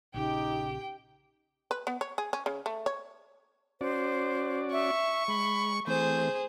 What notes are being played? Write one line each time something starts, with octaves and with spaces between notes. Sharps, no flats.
A#1 C#3 D#4 G4 G5
B4
B3
C#5
G#4
C#4
C#3
A3
C#5
C#4 F#4 C5 D5
E5 C#6
G#3 B5
E3 A3 C4 G#4 C5 G6